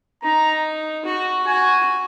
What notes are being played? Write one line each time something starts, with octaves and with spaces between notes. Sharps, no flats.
D#4 A#5
F#4
F#4 G#5